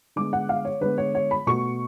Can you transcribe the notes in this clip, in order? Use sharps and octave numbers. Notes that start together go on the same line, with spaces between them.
D3 G#3 B3 D6
F#5
F5
C#5
D3 G#3 B3 B4
C#5
C#5
B5
B2 A3 C#6